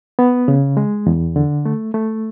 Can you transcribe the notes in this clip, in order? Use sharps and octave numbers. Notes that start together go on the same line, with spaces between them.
B3
C#3
G#3
E2
D3
A3
A3